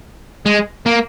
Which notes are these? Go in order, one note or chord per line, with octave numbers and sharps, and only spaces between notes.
G#3
A#3